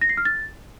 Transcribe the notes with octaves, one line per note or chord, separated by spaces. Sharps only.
A#6
C7
F6
A6